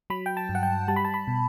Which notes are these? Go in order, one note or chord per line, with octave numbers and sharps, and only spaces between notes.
F#3 B5
G5
A5
G2
F#5
G5
G3 A5
B5
A5
B5
B2